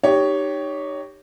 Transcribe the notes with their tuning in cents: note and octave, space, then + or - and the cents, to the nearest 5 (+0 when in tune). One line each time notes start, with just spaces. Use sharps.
D#4 -20 G4 +0 C#5 +10